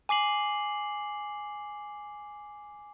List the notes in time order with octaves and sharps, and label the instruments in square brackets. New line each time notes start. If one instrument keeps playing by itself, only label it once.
[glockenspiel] G#5 D6 C7 F#7